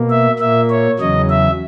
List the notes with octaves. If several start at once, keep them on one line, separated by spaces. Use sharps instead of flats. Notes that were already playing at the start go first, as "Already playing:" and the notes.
Already playing: B2 A#3
E5
A#2 A#3 E5
C#5
E2 C#3 F#3 D#5
E5